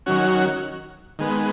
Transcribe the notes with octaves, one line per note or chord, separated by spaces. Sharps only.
D#3 F#3 C#4 F#4
D#3 G#3 B3